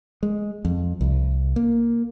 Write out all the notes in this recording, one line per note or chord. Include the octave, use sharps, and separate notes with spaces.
G#3
F2
C2
A#3